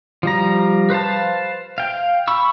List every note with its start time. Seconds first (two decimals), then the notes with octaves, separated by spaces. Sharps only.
0.23 F3 G3 A#5
0.90 B4 C5 F5 A5
1.78 F5 G5
2.28 B5 C#6 E6